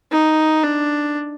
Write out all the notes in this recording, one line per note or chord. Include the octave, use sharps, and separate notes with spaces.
D#4
D4